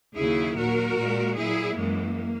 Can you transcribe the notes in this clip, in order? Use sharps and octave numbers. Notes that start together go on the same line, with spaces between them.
D#2 C#3 F#3 E4 G#4
A#2 F#3 F#4 A#4
A#2 G#3
A#2 F#3 E4 G#4
F#2 E3 G#3 A#3